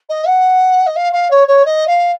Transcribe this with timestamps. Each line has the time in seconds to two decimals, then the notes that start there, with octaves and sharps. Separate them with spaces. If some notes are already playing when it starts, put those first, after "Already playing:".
0.09 D#5
0.26 F#5
0.86 D#5
0.96 F5
1.12 F5
1.30 C#5
1.47 C#5
1.65 D#5
1.87 F5